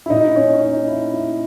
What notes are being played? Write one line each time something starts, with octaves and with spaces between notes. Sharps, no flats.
E4
A#2 D#4
C#4
D#4
E4
E4